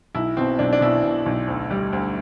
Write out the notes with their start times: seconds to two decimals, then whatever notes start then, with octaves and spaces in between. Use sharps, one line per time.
0.15 B1 E4
0.37 B2 C4
0.59 B1 D4
0.73 D4
0.81 B2 E4
1.03 B2
1.26 B1
1.48 D2
1.70 G3
1.93 D2